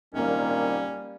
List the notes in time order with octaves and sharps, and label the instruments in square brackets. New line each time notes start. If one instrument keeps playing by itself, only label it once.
[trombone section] C2 A#2 D#3 [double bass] G3 A#3 [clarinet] C#4